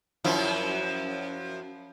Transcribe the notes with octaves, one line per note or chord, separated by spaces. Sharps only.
F#2 F3 E4